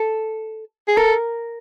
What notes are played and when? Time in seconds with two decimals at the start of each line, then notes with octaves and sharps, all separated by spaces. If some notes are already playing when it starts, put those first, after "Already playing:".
Already playing: A4
0.88 G#4
0.97 A4 A#4